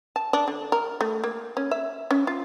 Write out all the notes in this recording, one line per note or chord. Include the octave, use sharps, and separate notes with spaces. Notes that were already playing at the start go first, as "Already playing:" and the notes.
A5
D4
D3
A#4
A3
A#3
C#4
E5
C#4
F4